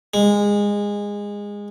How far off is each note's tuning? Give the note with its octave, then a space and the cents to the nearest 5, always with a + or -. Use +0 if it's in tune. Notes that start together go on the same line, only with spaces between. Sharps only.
G#3 -20